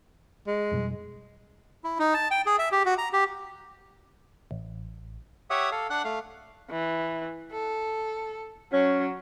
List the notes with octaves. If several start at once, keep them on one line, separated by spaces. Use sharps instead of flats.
G#3
F2 B2 G3
E4
D#4
A5
G5
G#4
E5
G4
F#4
A#5
G4
A1
G4 C#5 E5 F#5 D#6
A4 F5
D4 F#5 F#6
A3 F5
E3
A4
F#3 C#4